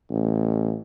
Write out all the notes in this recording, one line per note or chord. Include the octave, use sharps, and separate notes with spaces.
A1